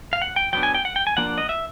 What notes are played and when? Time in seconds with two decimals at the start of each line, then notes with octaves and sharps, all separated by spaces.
0.13 F5
0.22 F#5
0.36 G5
0.53 F#3 B3 D4 G5
0.63 G#5
0.75 G5
0.85 F#5
0.96 G5
1.07 G#5
1.17 F3 A#3 D4 F#5
1.38 D#5
1.49 E5